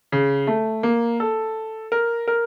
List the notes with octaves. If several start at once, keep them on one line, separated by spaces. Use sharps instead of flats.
C#3
A3
A#3
A4
A#4
A#4